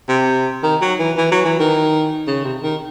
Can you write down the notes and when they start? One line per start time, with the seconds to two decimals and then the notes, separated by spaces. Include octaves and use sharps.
0.09 C3
0.63 D#3
0.82 F#3
0.99 E3
1.17 E3
1.32 F#3
1.45 E3
1.59 D#3
2.27 C#3
2.45 C3
2.63 D#3